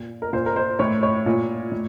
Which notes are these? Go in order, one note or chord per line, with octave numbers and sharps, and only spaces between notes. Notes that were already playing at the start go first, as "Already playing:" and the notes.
Already playing: A#2
A#4
A#2 C5
A#4
C5
A2 C#5
C#5
A#2
A2